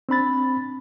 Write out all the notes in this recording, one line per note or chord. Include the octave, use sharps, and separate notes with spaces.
C4 D4 B5 A6